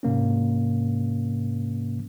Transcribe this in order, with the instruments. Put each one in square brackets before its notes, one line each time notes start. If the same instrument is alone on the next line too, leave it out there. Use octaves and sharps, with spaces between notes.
[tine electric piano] G#2 C3 A#3 C#4